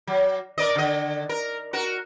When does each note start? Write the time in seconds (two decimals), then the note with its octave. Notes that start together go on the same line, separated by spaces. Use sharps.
0.07 F#3
0.58 A#4 D5 D#5
0.75 D3 D#5
1.29 A#4
1.73 F#4 A#4